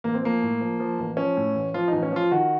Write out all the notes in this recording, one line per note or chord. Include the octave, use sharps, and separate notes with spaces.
A1 A#3
C4
F3 A#3
A2
F3
F3
A1
F3 C#4
A2
A1
F3 F4
A1 D#4
C#4
F3 F4
D#3 F#4